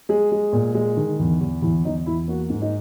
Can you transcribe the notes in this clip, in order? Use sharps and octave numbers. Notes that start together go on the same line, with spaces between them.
G#3 G#4
G#3
A#2
G#3
D#3
E2
E2
E2 E4
E2 D#4
E2 E4
A#3 F#4
G#2
D#4